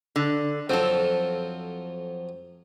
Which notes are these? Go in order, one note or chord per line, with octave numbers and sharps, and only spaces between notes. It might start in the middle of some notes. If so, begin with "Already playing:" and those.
D3
F2 F3 F#3 C4 A4